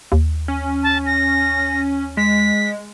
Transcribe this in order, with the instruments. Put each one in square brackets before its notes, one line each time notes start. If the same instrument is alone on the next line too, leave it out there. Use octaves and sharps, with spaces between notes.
[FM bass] D#2
[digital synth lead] C#4
[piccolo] A5
A#6
[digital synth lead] G#3 [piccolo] B6